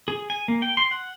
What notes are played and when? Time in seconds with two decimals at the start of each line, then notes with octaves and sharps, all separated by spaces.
0.08 G#4
0.30 G#5
0.48 A#3
0.62 G5
0.77 C6
0.91 F#5